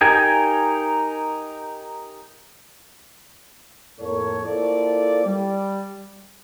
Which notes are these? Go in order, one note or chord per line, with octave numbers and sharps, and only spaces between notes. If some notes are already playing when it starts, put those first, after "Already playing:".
D#4 G4 A#4 G#5
F2 A2 A#3 A4 C#5
A#3 E4 F4 A4 C5 D5
G3